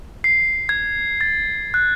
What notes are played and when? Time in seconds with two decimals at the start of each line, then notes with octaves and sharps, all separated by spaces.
0.24 C7
0.69 G#6
1.21 A6
1.74 F#6